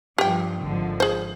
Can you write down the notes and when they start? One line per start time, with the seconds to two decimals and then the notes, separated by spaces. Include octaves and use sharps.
0.18 G2 F3 G4 G5
0.61 G#1 D3 F3
1.00 G#4 C5